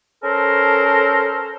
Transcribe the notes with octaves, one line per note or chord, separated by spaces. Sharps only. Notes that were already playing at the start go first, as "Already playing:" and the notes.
C#4 A4 A#4 C5